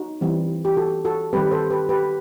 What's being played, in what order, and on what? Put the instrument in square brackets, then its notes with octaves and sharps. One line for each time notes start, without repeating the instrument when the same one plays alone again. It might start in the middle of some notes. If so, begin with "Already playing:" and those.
Already playing: [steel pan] D#4 F#4
E3 G3 C4
G4
F#4 A4
F#4 A4
D#3 G3 C4 G4 B4
A4 C5
G4 B4
G4 B4